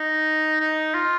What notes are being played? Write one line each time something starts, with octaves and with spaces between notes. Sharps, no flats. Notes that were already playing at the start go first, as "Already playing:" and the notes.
Already playing: D#4
D#4
F4